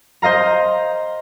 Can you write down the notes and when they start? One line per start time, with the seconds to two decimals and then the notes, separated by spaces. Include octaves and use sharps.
0.22 C5 D#5 F5 A#5